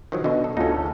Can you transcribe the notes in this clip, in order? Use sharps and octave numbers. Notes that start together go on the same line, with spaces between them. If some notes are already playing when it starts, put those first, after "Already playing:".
D#3 F3 F#3
B2 D3 D#5
A4
D2 C#4 D#4 F4 A4